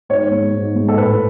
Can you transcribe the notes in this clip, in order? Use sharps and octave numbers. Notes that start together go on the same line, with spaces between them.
G#2 C#5
G#3
G#2
G#3
A4
A2 B4